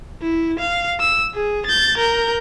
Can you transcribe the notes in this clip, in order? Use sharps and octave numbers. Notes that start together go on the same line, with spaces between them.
E4
F5
E6
G#4
G6 A6
A#4 G6